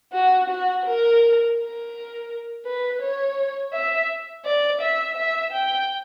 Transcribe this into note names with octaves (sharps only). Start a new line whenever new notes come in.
F#4
F#4
A#4
A#4
B4
C#5
E5
D5
E5
E5
G5